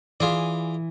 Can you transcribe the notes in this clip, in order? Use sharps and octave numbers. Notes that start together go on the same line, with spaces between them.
E3 F4 G#4 D5